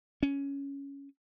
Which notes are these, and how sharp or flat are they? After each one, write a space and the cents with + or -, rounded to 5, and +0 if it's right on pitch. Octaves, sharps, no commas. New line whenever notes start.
C#4 +5